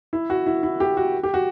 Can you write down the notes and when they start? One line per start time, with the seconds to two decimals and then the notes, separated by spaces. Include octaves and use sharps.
0.13 E4
0.30 F#4
0.46 E4
0.63 E4
0.80 G4
0.97 F#4
1.23 G4
1.34 F#4